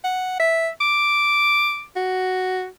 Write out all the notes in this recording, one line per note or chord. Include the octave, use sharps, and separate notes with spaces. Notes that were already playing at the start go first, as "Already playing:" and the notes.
F#5
E5
D6
F#4